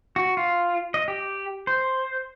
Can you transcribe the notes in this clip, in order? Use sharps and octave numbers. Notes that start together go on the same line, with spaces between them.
F#4
F4
D#5
G4
C5